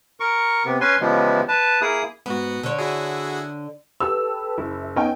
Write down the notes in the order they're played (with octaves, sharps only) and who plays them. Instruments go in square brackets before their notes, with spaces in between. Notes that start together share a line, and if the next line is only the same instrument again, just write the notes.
[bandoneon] A#4 C#6
C3 B3
C#4 B4 G#5 C6
C#3 E3 F3 G3 G#3 B3
B4 A5
A#3 E4 G#4 D#6
[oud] G#2 [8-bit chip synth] B3 F#4
[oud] D3 C#5
[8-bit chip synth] E4 F#4 G#4
[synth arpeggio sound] G4 A4 B4 [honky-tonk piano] E6
[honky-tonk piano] F#1 [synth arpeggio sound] E4
[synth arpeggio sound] B3 C#4 D#4 [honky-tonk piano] D#5 G5 G#5